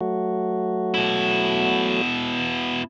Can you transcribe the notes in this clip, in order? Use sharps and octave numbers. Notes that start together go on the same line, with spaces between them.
F#3 A3 F#4
B2 E4